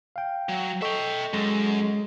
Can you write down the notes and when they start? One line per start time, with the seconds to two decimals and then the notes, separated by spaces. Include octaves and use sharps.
0.16 F5 G5
0.49 F#3
0.82 A4 D#5 E5 G5 C#6
1.33 F#2 G#3